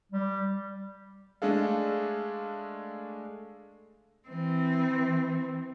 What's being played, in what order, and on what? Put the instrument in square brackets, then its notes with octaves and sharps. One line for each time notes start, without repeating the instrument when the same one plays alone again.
[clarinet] G3
[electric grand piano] G#3 A3 D4 G#4 A4 F5
[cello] E3 C4